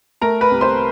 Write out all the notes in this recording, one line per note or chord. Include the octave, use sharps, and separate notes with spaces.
A3 A#4 A#5
B4 B5
C2
C5 C6